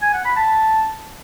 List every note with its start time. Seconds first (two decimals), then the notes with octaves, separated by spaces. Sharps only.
0.02 G#5
0.13 F#5
0.25 B5
0.37 A5